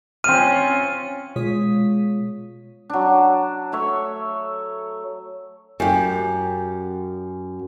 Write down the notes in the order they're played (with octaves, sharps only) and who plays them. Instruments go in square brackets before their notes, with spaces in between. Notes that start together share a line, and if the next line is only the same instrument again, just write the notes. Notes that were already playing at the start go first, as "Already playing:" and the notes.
[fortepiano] C4 F6 [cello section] C#4 F4 [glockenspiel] D#7
[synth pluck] B2 G#3 F4 C#5 D#6 B6
[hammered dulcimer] F#3 D4
A3 C#5 E5
[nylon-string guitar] F#2 G4